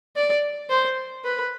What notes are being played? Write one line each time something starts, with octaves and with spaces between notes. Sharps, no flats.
D5
C5
B4